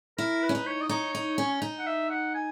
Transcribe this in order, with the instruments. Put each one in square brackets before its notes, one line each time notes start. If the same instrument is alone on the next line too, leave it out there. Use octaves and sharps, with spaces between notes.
[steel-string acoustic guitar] E4 [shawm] A#4
[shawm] B4
[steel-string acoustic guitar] C#4
D#4
[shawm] C#5
D#5
[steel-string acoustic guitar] D#4 [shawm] C#5
[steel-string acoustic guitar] D#4
C#4
D#4
[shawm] F#5
E5
F#5
G#5